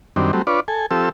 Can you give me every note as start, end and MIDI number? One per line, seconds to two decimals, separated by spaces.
0.16 0.31 42
0.16 0.31 51
0.16 0.31 55
0.16 0.31 60
0.16 0.31 62
0.33 0.42 54
0.33 0.42 55
0.33 0.42 57
0.33 0.42 60
0.47 0.60 62
0.47 0.60 65
0.47 0.60 71
0.47 0.60 73
0.47 0.60 74
0.68 0.86 69
0.68 0.86 80
0.91 1.09 53
0.91 1.09 60
0.91 1.09 67
0.91 1.09 69
0.91 1.09 88